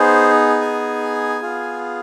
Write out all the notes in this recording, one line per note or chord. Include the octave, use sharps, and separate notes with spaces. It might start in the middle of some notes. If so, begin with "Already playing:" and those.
Already playing: B3 D#4 G#4 C5
G#5
B3 F4 G#4